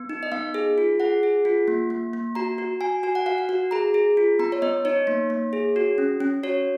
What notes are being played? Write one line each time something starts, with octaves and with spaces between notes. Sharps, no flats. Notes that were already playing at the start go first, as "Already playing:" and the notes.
Already playing: B3
D#4
D#5
B3 F5
G#4
F4
G#4 F#5
G#4
F4
A#3
A#3
A#3
F#4 A#5
F#4
F#4 G#5
F#4 G#5
F#5
F#4 F5
F#5
F#4
G#4 A#5
G#4
F4
B3 A#5
C#5
B3 D#5
D#4 C#5
A#3
A#3
G#4
F#4
C#4
C#4
F#4 C#5